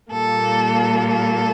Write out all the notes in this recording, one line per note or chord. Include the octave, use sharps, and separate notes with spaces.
A#2 G3 A#3 A4
A4